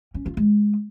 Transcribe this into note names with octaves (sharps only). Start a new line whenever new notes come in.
C#4
F4
G#3